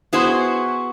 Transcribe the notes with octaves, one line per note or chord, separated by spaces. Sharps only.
B3 E4 F#4 G#4 C5